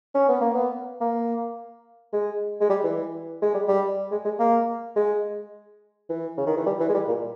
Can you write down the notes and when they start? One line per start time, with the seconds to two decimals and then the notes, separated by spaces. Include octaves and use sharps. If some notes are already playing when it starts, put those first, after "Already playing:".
0.15 C#4
0.29 B3
0.41 A#3
0.55 B3
1.01 A#3
2.14 G#3
2.61 G#3
2.70 G3
2.84 E3
3.42 G#3
3.55 G3
3.68 G3
4.12 G#3
4.25 G#3
4.40 A#3
4.96 G#3
6.10 E3
6.38 C#3
6.47 D#3
6.57 E3
6.67 G3
6.80 E3
6.90 G#3
6.94 G3
7.08 A#2